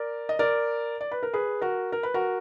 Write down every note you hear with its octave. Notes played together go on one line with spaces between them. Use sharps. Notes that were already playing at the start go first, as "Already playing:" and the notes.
Already playing: A#4 D5
D#5
A#4 D5
D5
B4
A#4
G#4 B4
F#4 A#4
A#4
B4
F#4 A#4